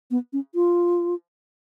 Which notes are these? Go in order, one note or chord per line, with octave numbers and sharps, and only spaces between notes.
B3
C#4
F4